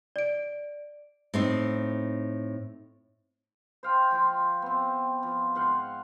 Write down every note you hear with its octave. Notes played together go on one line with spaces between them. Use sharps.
D5 D7
A2 C4 D#4
C5 F5 G5
F3 F4 G5 C6
B3 C4
F3
G#2 F5 F#5 C6